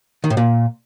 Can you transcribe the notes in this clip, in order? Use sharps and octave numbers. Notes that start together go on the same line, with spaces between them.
D#3
A2
A#2